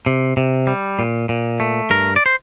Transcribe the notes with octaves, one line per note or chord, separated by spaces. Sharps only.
C3
C3
G3
A#2
A#2
A3
G2 A#4
D5
C5